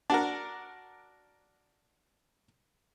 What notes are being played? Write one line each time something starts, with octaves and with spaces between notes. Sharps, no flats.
D4 F#4 A#4